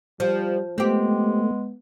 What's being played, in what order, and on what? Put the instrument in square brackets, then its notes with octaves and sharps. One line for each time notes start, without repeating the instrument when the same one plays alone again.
[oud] F3 [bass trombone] G3
[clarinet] G#3 [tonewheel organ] A3 [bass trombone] B3 [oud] C4 G4